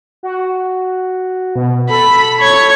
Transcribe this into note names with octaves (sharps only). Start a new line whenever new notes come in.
F#4
B2
A4 B5
C#5 G#6